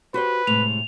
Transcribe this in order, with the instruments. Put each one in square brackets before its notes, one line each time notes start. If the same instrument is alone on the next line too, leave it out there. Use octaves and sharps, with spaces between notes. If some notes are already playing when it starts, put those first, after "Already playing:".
[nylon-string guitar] F#4 G4 C5 [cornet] B4
[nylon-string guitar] A2 C3 G#3 [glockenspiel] F7